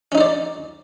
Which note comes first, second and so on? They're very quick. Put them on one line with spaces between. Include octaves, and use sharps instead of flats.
C#4 D#4 C5 D5